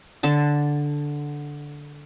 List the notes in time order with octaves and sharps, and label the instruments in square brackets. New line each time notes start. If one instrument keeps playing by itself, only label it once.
[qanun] D3 A5